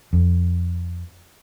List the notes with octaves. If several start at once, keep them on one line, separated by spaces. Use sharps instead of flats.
F2